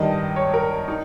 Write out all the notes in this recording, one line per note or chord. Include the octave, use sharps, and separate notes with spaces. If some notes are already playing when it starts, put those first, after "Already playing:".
Already playing: G2 D#3 D#5
C#5
A#4
D#4